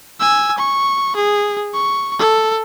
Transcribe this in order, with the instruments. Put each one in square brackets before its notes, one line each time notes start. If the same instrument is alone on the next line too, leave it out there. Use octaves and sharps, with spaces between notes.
[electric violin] G#5 E6
C#6
G#4
C#6
A4